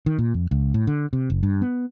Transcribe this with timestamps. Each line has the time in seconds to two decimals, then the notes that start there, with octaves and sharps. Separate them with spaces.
0.06 D#3
0.18 A#2
0.34 F2
0.51 C#2
0.74 A2
0.87 D3
1.13 C3
1.30 F#1
1.43 G2
1.62 B3